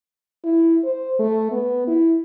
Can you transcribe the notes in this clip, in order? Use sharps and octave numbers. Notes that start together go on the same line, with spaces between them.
E4
C5
A3
B3
E4